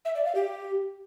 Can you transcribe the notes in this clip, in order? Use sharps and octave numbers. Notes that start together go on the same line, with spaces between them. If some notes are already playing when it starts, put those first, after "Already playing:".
E5
D5
F5
G4